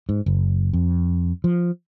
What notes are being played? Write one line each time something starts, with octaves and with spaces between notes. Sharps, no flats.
G#2
F#1
F2
F3